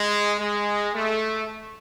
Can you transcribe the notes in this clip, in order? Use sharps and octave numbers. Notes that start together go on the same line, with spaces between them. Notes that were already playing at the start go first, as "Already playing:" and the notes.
Already playing: G#3
G#3
A3